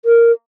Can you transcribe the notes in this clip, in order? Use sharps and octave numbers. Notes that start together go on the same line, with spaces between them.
A#4